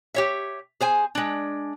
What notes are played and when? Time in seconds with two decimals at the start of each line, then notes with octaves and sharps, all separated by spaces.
0.14 G4 C#5 E5
0.80 G#4 C5 G#5
1.15 G#3 D4